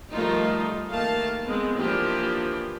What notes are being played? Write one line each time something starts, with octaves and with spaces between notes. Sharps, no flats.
D#3 F3 G3 A3 D#4 F4
D#3 A3 A#3 F5 A5
G#3 B3 C4
E3 F3 A#3 D4 G4